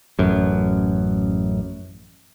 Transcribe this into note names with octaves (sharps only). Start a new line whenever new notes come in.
A1 F#2